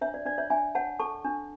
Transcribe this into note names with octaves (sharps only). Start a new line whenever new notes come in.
D4 C#5 E5
D5
D4 D5
C#5 E5
D4 E5 G#5
C#5 F#5 A5
A4 A5 C#6
D4